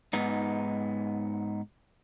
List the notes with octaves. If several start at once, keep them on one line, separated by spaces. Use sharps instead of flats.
G#2 B3 D#4